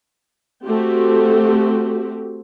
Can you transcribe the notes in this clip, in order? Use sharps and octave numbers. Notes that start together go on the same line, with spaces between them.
A3 C4 F#4 G4